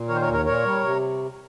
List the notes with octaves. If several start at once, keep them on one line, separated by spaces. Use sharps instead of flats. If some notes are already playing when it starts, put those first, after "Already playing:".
Already playing: A#2
D#3 A#4 C#5
C5
A#4 C#5
D#2
A#4 C#5
A#2 A#4 C#5
G3
C3